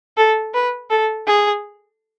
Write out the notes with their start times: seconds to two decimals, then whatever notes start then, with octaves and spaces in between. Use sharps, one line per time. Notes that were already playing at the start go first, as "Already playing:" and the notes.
0.17 A4
0.54 B4
0.90 A4
1.27 G#4